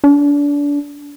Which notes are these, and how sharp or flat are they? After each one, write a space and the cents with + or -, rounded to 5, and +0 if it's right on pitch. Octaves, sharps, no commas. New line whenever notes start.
D4 -30